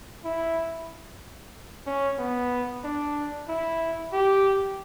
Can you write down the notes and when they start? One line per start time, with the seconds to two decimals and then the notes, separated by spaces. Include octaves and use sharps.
0.25 E4
1.87 C#4
2.18 B3
2.84 D4
3.48 E4
4.13 G4